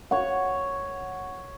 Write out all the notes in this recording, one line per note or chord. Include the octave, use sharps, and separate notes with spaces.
C#5 F#5